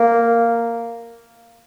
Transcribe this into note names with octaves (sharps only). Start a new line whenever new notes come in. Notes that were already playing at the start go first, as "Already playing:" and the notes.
Already playing: A#3